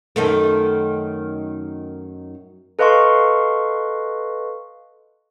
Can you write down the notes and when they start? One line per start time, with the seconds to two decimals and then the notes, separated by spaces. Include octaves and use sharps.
0.16 F#2 D#3 A3
2.79 A4 B4 D#5 F5 C6 C#6